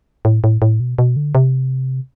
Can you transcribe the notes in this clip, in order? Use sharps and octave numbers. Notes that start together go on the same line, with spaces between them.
A2
A2
A2
B2
B2
D3
C3